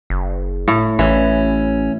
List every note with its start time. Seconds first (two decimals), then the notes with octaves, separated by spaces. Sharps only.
0.10 F#1
0.68 A2
0.99 A1 E3 C#4